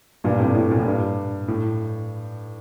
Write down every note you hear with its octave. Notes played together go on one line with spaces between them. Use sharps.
G2 A#2
A2 C3
A2
A#2
A2
G2
A2